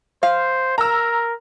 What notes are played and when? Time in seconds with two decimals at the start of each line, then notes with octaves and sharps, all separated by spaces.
0.23 C5 F5
0.78 A#4 A#5 E6